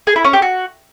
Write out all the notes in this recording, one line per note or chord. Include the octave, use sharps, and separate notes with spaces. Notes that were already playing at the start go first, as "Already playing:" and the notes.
G#4
E4
C#4
G4
F#4